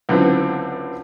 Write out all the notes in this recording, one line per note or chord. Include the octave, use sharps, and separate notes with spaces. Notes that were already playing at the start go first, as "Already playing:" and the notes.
C#2 F#2 D3 E3 B3 C4